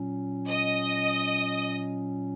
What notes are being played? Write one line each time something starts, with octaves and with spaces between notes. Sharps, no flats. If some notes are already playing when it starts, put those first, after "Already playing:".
Already playing: A#2 F#3 C#4
D#5